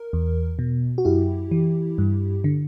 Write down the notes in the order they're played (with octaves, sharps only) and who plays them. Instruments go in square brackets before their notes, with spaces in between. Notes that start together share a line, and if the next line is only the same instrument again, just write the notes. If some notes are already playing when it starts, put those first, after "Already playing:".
Already playing: [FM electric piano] A#4
E2
B2
F#4
F#2 E4 G4
E3
G2
D3